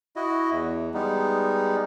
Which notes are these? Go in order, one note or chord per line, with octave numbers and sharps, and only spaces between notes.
E4 F#4 D#5
E2
G3 G#3 B3 D#4